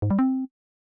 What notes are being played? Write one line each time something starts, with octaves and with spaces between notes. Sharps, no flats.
G#2
G3
C4